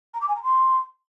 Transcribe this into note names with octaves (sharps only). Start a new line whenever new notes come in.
A#5
D6
G#5
A#5
C6